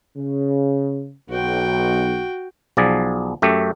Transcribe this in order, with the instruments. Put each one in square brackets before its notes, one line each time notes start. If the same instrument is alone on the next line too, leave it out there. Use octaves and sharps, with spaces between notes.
[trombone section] C#3
[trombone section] B1 [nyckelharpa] F#4 G5
[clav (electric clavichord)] B1 F3 G#4 D5
F#2 A3 G4